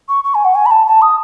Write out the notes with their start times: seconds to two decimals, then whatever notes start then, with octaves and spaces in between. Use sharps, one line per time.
0.09 C#6
0.24 C#6
0.35 G#5
0.45 F#5
0.55 G#5
0.66 B5
0.71 A5
0.87 A5
1.02 D#6